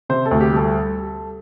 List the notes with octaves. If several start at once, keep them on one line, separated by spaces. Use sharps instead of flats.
C3 C5
A4
D2
G4
G3 A4